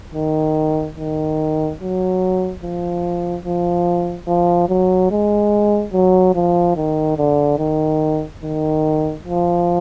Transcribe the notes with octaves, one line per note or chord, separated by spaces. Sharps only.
D#3
D#3
F#3
F3
F3
F3
F#3
G#3
F#3
F3
D#3
D3
D#3
D#3
F3